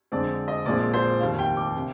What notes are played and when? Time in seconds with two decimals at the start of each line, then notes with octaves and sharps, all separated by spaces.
0.12 F2 D3 G#3 C4 D5
0.48 D#5
0.66 A#1 A#2 F3 G#3 C4 D5
0.94 C5
1.20 F1 D#2 D#3 F5
1.39 G5
1.57 D6
1.77 C3